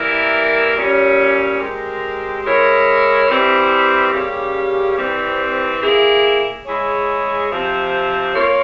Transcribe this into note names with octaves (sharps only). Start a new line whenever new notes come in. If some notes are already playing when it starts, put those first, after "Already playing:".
Already playing: E3 G3 A#3 E4 A#4
A#2 G3 C#4
G#3 C4 G4 A#4
G#3 E4 A#4 C#5
E3 G3 C4 E4
C#3 G3 A#3 C#4 G4
E3 G3 C4
A#3 E4 G#4
G#3 E4 G#4 C#5
C3 F3 C4
A#3 F4 A#4 C#5